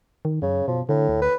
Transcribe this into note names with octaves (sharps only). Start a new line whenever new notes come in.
D#3
F#2 C#3
B2 F3
A2 D3
D2
B4